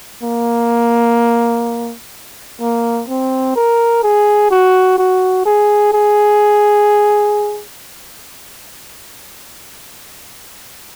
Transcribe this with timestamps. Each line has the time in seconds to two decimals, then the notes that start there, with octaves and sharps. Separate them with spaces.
0.24 A#3
2.61 A#3
3.08 C4
3.56 A#4
4.03 G#4
4.51 F#4
4.98 F#4
5.45 G#4
5.93 G#4